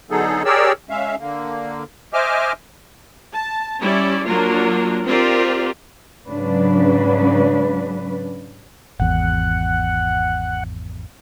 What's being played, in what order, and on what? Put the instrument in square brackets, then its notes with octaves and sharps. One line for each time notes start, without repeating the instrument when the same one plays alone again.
[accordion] D3 F#3 B3 D#4 G#4 A4
G4 G#4 A#4 C#5 D5 E6
G#3 C#4 E5 F5
D3 A#3
C5 D#5 E5 G#5 D6 F6
[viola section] A5
G3 C#4 E4 D5
F#3 A#3 D4 F4 A#4
C4 F4 G4 A#4 D5
[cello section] G#2 C#3 F#3 C#4 D4 B4
[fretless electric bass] G#1 E2 [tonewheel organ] F#5